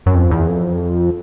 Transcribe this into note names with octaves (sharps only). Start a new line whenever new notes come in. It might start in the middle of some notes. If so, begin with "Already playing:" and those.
F#2
F2
E2
F2